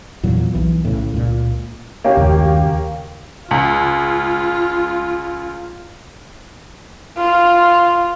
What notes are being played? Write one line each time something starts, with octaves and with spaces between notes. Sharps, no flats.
E2 A#2 F#3
B1 E3
A2 C#3
C#2 A#2
A#3 C#4 G4
D#2 C#3
C#2 F4
F4